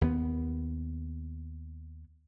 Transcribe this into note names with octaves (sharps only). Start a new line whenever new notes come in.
D#2 B3